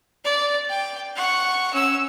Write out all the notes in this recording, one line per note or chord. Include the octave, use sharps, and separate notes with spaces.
D5
G5
F#5 C#6
C#4 E6